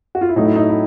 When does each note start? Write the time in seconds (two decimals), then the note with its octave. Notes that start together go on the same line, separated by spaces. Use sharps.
0.15 F#4
0.21 F4
0.29 E4
0.36 A2 F#3 A3 D#4
0.45 E4
0.56 D#4
0.69 E4